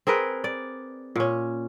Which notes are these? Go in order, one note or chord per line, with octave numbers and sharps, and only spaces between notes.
C4 G#4 A#4 B4
D5
A#2 C#4